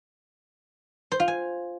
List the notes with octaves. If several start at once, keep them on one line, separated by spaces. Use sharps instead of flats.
C5
F4
G#5